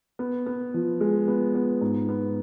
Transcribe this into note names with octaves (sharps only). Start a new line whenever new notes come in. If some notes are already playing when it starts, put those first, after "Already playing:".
B3
B3
F3
G#3
B3
B3
G#2
B3